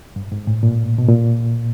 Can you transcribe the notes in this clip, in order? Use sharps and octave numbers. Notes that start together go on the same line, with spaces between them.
G2
G#2
A2
A#2
B2
A#2